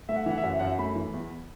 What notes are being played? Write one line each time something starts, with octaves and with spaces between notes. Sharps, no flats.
A3 E5
F#5
E5
E3 F#5
E5
F#2 F#5
E5
F#2 F#5
E5
A3 B5
E3
E2